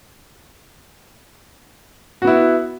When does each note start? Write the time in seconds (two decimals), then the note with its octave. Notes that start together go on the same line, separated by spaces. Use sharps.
2.22 F#4
2.25 B3
2.27 E4